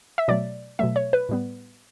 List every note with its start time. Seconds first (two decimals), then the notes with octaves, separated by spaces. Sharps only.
0.18 E5
0.28 B2 F#3 A3 D5
0.79 B2 F#3 A3 E5
0.96 C#5
1.13 B4
1.29 A2 G3 B3